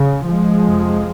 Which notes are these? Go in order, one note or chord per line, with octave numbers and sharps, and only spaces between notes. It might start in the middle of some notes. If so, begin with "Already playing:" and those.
Already playing: C#3
F3 G#3
F2 C3